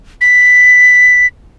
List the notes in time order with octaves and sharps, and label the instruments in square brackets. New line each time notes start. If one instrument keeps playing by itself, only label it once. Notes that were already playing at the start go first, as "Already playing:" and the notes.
[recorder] B6